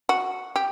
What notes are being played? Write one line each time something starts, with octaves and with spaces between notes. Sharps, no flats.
F#4
G4